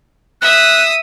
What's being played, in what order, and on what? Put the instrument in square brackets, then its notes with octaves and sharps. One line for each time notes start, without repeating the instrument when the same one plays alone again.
[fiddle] E5 D#6 [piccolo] F#6